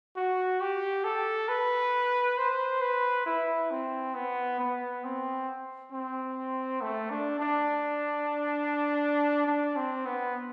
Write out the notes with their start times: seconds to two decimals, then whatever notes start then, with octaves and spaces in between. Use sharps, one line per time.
0.16 F#4
0.61 G4
1.04 A4
1.48 B4
2.38 C5
2.81 B4
3.26 E4
3.71 C4
4.14 B3
4.59 B3
5.04 C4
5.92 C4
6.81 A3
7.10 D4
7.40 D4
9.47 D4
9.76 C4
10.06 B3